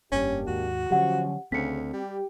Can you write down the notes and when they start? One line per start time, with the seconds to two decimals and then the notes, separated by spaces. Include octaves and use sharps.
0.12 F1 G2 A#3 C#4 D4 G4
0.47 D#2 G#2 F#4
0.90 D3 F3 F#3 C#4 G4 F#5
1.52 D2 C#3 C4 B6 C#7
1.94 G3 G4